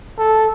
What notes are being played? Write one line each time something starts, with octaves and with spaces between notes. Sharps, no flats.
A4